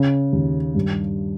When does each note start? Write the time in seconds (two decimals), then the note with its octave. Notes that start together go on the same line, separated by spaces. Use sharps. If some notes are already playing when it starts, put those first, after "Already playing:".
Already playing: C#3
0.33 D#2
0.75 G2